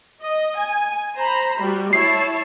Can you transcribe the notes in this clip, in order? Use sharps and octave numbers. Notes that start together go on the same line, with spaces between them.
D#5
G#5
C5 A#5 B5
G3 F#4
E4 C#5 A5 C7